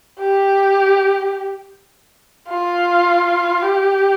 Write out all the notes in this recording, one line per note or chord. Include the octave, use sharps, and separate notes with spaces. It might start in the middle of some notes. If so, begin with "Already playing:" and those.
G4
F4
G4